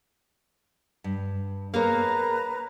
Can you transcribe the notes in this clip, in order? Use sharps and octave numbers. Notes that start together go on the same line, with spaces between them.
G2
A#3 G#4 A#4 B4 C#5 A#5